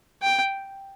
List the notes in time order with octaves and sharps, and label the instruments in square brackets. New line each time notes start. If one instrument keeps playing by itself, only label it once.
[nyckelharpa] G5